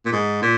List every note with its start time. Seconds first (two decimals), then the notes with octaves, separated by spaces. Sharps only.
0.05 A#2
0.12 G#2
0.42 A#2